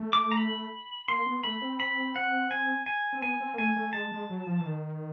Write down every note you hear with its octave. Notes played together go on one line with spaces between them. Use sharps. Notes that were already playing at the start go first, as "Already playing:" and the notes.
Already playing: A3
D6
A#5
B5
A#3 C6
B3
A3 B5
C4
B5
F#5
G#5
G#5
C4
B3 G#5
C4
A#3
A3 G#5
A3
G#3 A5
G#3
F#3
F3
E3
D#3